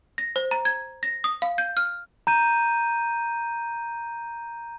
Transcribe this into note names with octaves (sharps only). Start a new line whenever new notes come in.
A#6
C5
A#5
G#6
A#6
D#6
F5
G6
F6
A#5 G6 D#7